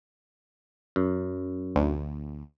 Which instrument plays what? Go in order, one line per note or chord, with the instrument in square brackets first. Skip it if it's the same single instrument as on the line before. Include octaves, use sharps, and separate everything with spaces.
[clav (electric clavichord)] F#2
[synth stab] D2